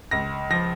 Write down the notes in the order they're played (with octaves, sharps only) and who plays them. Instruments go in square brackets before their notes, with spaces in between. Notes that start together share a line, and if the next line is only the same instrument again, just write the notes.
[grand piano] C#2 A#6
F3 A#6